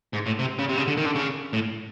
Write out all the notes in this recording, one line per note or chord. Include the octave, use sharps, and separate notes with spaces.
G#2
A2
C3
C#3
C3
C#3
D3
D#3
D3
C#3
A2